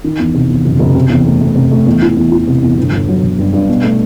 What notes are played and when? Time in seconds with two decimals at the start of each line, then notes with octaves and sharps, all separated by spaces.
0.04 D#3
0.19 E2
0.34 C3
0.50 E2
0.65 F#1
0.79 F#1
0.95 C3
1.10 E2
1.25 A3
1.41 A3
1.56 C3
1.71 A3
1.86 E2
2.02 E3
2.17 E2
2.32 E3
2.47 C3
2.63 E2
2.78 G1
2.92 G1
3.08 F#3
3.23 G1
3.38 G2
3.53 G2
3.69 B2
3.83 A3